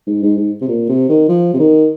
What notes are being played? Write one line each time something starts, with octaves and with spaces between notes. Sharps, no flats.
G#2
G#2
G#2
C3
A#2
C3
D#3
F3
C3
D#3